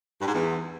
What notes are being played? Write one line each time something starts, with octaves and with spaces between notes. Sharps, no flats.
G2
G#2
E2